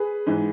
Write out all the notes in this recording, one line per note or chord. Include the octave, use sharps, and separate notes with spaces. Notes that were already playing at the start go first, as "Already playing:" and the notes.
Already playing: G#4 B4
G#2 E3